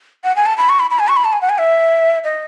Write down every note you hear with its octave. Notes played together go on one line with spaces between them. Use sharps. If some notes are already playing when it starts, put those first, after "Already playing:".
F#5
G#5
A5
B5
C#6
B5
B5
G#5
C#6
B5
A5
G#5
F#5
G#5
E5
D#5